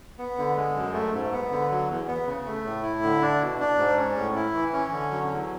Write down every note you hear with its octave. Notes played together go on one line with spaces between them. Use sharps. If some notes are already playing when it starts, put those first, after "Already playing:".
B3
D3
G#3
F#2
A3
G#2
B3
D3
F#3
E2
B3
C#3
A3
A2
E4
D3
D4
B2
D4
G#2
C#4
A2
E4
E3
C#4
D3
F#3
E2